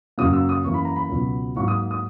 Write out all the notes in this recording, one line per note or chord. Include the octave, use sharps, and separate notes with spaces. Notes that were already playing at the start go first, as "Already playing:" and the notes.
F#2 C#3 F#3 A#3 D#6
E6
D#6
F#2 E3 A#3 C#6
B5
A#5
B5
C#2 B2 F#3
G#2 F#3 A#3 C#6
D#6
D#6